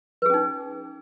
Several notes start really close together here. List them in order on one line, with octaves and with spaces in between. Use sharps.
B4 G#4 C#4 D#4